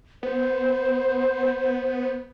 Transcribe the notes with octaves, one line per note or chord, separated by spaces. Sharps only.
B3 C5